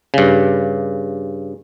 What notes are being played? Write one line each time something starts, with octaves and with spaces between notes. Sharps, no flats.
G2 C#3